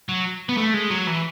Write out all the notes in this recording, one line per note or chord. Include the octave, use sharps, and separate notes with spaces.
F#3
B3
A3
G#3
F#3
E3